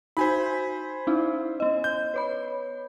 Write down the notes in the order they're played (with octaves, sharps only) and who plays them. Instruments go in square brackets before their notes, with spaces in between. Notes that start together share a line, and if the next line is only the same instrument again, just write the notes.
[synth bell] D#4 F#4 B6 [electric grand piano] C5 G#5 B5
[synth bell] C#4 D#4 E4
B3 D#5
[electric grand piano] G6
[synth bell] B4 C#5 B5